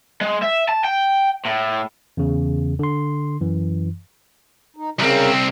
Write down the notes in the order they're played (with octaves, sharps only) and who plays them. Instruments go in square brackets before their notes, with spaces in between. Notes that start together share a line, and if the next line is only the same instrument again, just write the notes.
[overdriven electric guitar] G#3
E5
A5
G5
A2
[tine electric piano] E2 C#3
D3 C6
F#2 E3
[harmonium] D#4
[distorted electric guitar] C2 C4 [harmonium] C#3 A#4